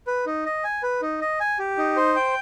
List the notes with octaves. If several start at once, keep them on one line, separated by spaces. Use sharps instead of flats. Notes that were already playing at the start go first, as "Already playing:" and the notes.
B4
D#4
D#5
G#5
B4
D#4
D#5
G#5
G4
D#4
C5
G5